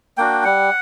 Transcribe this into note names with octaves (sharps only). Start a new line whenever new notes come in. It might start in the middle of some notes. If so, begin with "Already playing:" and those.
A#3 D4 F#4 G5
G3 F#5